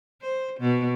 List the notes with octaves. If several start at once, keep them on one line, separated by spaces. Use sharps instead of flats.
C5
B2